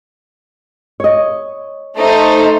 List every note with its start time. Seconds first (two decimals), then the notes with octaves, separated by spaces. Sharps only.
1.00 C#5 D#5
1.97 A3 D#4 C5